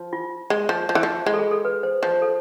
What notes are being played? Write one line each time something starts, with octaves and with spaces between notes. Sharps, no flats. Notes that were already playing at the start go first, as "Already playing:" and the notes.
Already playing: F3
F4
G#3
F3
F3
E3
F3
G#3 F4
A4
G#4
A4
B4
C5
F3 C5
A4